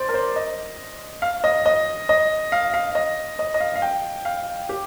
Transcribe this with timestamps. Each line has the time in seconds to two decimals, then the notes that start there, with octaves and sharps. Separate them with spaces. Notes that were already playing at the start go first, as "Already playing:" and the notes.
Already playing: C5 D5
0.09 A#4
0.14 C5
0.36 D#5
1.22 F5
1.44 D#5
1.66 D#5
2.09 D#5
2.52 F5
2.74 F5
2.95 D#5
3.39 D#5
3.54 D#5
3.60 F5
3.76 F5
3.82 G5
4.25 F5
4.69 G4